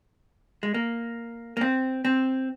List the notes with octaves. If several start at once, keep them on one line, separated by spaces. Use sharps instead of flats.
G#3
A#3
A#3
C4
C4